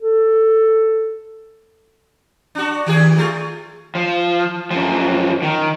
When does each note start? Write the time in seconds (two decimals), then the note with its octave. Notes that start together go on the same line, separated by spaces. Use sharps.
0.02 A4
2.55 D4 F#4
2.86 D#3 G4 G#4
3.18 A3 F4
3.95 F3
4.71 F#2 F3
5.42 D#3